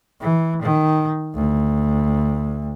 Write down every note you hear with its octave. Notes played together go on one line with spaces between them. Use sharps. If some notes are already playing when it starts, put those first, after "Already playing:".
E3
D#3
D2